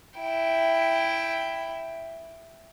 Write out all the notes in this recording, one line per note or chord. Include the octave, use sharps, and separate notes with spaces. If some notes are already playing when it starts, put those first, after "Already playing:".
E4 G5